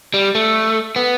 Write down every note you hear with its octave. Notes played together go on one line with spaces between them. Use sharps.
G3
A3
B3